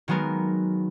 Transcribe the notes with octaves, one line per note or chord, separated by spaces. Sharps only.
D#3 F#3 G#3 B3 A#4